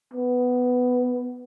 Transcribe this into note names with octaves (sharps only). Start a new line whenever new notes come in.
B3